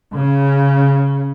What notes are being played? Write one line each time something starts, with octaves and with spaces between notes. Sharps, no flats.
C#3